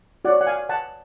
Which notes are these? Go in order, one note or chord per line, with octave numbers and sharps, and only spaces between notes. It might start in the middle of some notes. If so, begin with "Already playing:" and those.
F#4 C#5 D5 F#5
F#5
F5 G#5
F#5 A5